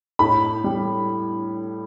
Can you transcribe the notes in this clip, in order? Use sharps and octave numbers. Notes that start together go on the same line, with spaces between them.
A2 B5
G3